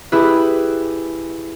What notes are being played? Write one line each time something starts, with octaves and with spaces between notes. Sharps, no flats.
E4 G4 G#4 B4